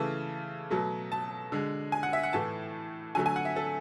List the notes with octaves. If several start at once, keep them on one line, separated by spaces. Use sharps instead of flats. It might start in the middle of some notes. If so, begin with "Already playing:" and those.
Already playing: C#3 E3 A3 A5
B2 F#3 A3
A5
D3 G#3
G#5
F#5
E5
F#5
A2 E3 A3 A5
D3 F#3 A3 G#5
G#5
F#5
E5
A4